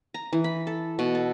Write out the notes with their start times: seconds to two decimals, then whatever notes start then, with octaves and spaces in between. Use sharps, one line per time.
0.14 A#5
0.33 E3
0.44 B5
0.67 A4
0.99 B2
1.15 A4